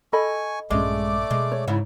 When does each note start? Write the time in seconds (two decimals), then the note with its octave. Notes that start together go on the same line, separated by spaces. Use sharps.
0.13 A4 D#5 G#5 B5 C#6
0.71 A#1 G2 G#3 A3 C#4 D5 D6
1.31 B2 G#3
1.52 C#5
1.68 G#2 C#3 E4